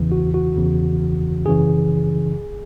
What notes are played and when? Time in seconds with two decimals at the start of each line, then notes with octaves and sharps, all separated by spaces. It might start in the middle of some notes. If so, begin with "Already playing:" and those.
Already playing: E2 C#3 E3
0.12 F#4
0.34 F#4
0.56 E2 C#3 E3
1.45 F#2 C#3 E3 G#4